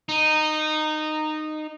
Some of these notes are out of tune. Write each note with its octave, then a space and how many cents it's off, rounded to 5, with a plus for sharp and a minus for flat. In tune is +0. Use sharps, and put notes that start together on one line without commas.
D#4 -15